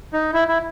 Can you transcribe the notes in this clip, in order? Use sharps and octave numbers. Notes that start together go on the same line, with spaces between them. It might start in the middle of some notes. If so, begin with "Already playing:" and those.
D#4
E4
E4